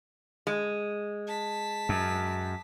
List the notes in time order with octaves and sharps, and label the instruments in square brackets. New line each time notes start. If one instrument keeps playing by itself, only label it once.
[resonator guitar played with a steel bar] G#3
[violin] A5 B6
[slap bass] F#2